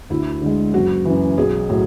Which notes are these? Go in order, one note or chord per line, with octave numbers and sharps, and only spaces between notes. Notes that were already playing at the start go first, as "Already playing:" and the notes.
D2 E4
D3 G#3
F#1 F#4
F#2 E3
B1 G#4
A2 F#3